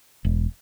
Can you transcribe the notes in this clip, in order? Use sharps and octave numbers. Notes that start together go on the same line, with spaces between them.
E1